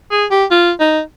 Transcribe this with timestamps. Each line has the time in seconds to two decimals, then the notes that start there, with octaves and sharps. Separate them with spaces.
0.11 G#4
0.31 G4
0.51 F4
0.80 D#4